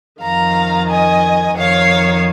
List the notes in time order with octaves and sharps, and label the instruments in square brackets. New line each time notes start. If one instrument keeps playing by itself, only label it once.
[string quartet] F2 D#3 F5 A#5
D#5 G#5
F2 D#3 C#5 F5